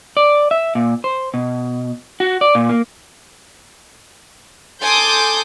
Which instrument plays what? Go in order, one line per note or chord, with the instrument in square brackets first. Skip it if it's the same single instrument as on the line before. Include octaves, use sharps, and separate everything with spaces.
[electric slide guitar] D5
E5
A#2
C5
B2
F#4
D5
A#2
A#3
[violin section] A4 G#5 C6 D6 D#6 G6